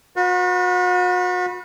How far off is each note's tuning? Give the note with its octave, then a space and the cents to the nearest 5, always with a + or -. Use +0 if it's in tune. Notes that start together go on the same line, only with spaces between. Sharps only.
F#4 -40 B4 -15